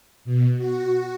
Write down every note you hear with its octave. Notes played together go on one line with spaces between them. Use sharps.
B2
F#4